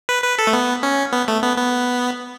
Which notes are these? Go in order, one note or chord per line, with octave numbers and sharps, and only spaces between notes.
B4
B4
A4
A3
B3
C#4
B3
A3
B3
B3